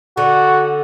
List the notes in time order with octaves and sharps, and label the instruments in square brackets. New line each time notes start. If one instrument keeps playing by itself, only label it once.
[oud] D3 [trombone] F#4